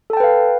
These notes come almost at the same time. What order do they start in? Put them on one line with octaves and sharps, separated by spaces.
A4 A5 G5 B4 F5